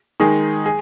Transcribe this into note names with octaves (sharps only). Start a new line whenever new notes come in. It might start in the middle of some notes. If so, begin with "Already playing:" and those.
D#3 G#3 D#4 G#4
G#4